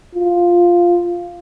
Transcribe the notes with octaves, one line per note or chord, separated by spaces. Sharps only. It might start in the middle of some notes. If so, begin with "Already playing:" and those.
F4